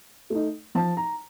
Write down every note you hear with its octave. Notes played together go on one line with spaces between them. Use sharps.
A3 D#4
F3 A5
A#5